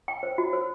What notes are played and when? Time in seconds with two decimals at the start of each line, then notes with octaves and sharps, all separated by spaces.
0.08 G5
0.23 C5
0.38 F#4
0.53 C5